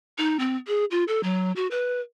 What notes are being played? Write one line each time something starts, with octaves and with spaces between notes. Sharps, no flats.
D#4
C4
G#4
F4
A4
F#3
F#4
B4